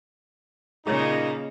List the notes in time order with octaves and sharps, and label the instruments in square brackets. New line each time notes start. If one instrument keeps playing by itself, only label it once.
[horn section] A#2 D#4 [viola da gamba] C#3 A#3 [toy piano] G#4 C#5